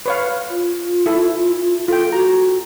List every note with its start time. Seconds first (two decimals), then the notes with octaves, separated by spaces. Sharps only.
0.06 B4 C#5 F5
0.50 F4
1.06 E4 A4
1.88 F4 A4 G5
2.12 F#4 A#5